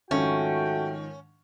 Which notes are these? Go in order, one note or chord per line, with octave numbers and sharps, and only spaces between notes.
G#2 D#3 F3 A3 C#4 F#4 G5